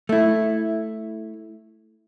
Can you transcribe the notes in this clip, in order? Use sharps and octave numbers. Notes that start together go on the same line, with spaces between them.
A3 E4